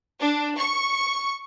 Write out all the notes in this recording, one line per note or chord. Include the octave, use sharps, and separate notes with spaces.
D4
C#6